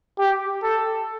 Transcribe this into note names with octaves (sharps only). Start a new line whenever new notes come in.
G4
A4